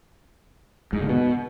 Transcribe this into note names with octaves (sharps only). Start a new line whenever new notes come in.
G#2
D3
B2